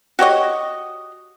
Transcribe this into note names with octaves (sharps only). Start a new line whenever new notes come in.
F#4 G4 C#5 D#5